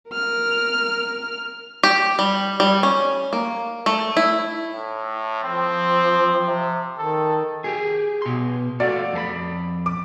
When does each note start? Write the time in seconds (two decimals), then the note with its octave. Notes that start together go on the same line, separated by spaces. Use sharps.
0.12 A#4 F6
1.83 G4
2.19 G3
2.60 G3
2.83 C#4
3.33 A#3
3.86 A3
4.17 E4
4.71 A2
5.43 F3 C4
6.47 C3
6.98 D#3 A4
7.64 G4 G#4
8.22 B2 C6
8.80 A3 F4 F#4 D5
9.13 F2 A4 B5
9.86 D6